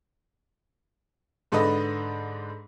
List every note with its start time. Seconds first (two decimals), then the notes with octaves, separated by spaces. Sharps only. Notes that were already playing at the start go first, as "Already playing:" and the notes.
1.52 G#2 D3 A4 B4 D#5